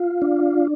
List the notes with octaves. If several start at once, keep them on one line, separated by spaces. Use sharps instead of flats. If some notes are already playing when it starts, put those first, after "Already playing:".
Already playing: F4
D4